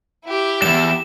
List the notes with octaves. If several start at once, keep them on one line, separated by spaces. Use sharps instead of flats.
E4 G4
E2 G2 E7